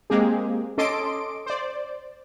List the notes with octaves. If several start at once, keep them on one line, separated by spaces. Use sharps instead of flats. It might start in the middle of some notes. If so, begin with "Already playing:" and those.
G#3 A#3 C4 G4 G#4
C#4 A4 D#5 C6 D6 D7
C5 D5